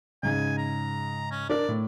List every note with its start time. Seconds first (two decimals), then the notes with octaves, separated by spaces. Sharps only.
0.23 G#2 C#3 G#5
0.58 A#5
1.31 C#4
1.49 D4 A#4 D5
1.69 A2